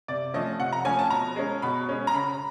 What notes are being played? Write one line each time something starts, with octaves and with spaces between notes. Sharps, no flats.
C3 D5
F3 A3 C#4 D#5
C3 F#5
A#5
F3 A3 C#4 G#5
A5
B2 A#5
G#3 C#4
B2 B5
G#3 C#4
A#5
C#3 B5